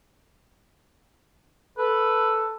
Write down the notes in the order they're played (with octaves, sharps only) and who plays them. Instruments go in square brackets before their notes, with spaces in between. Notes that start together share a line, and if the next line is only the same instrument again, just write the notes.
[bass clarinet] A4 [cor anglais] B4